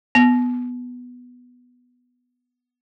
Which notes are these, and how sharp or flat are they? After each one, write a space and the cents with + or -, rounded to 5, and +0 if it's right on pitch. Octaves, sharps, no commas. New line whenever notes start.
B3 +0